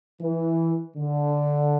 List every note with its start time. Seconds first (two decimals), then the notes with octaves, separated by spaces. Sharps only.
0.21 E3
0.97 D3